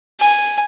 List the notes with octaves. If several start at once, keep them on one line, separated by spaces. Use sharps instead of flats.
G#5